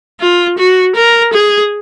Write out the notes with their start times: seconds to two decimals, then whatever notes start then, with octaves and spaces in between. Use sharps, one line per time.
0.20 F4
0.58 F#4
0.96 A#4
1.33 G#4